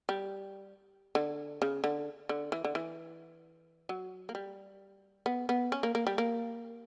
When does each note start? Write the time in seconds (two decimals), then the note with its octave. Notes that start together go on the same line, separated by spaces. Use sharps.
0.09 G3
1.15 D3
1.62 C#3
1.84 D3
2.29 D3
2.52 E3
2.64 D3
2.75 E3
3.89 F#3
4.29 A#3
4.35 G3
5.26 B3
5.49 B3
5.72 C#4
5.83 A#3
5.95 A#3
6.07 G3
6.18 A#3